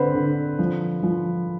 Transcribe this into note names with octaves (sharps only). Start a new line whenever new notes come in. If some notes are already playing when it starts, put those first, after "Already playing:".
Already playing: D3 C4 B4 C5
D3
F3
F3